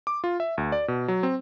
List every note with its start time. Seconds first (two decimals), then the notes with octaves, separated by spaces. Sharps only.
0.07 D6
0.24 F4
0.40 E5
0.58 D2
0.72 D5
0.88 B2
1.08 F#3
1.23 C4